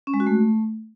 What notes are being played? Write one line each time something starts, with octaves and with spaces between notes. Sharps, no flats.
C#4
G#3
F#4
A3